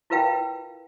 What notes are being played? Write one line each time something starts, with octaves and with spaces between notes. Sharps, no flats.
E4 F4 A#4 B4 F5 G5